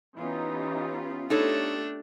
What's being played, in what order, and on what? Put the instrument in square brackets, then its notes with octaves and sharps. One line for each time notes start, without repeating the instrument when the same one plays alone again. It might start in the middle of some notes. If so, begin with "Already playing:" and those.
[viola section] E3 D#4 G4 [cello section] B3 C#4 F4
[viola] A3 D4 [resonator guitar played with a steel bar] D#4 A4 C#5 [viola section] G4